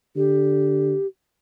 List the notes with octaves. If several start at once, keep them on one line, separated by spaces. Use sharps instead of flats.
D3 G4